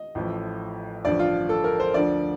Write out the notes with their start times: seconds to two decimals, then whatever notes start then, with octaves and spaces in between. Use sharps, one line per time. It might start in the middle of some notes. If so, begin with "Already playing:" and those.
Already playing: D#5
0.15 A1 A2 F3
1.05 A1 G2 D3 F3 D5
1.19 F4
1.49 A4
1.64 A#4
1.80 C5
1.94 D2 D3 F3 D5